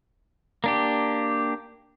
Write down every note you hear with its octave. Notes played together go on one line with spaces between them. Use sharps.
A#3 D4 G4